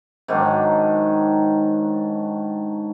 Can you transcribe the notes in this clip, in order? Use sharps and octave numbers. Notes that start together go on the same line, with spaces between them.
G#2 D#3 F#3 D4